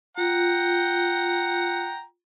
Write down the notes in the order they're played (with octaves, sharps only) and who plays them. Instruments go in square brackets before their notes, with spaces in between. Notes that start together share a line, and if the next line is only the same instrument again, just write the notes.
[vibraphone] F4 [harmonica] F#5 G5 A#5